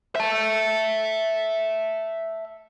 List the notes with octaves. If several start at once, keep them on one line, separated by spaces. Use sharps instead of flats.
E5 A5